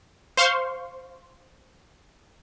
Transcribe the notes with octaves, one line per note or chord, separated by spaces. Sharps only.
C5 F5 C6 C#6